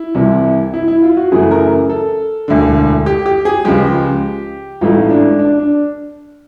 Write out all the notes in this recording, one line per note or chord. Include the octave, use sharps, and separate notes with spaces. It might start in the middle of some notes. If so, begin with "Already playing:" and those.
Already playing: E4
C2 C3 E3
E4
E4
F4
F#4
F#2 C#3 E3 A3 G#4
A#4
A4
E1 D2 D3
G4
G4
G#4
C#2 C#3 F3 G#3 G4
A1 G#2 E3 A3 F4
D4
D4
D4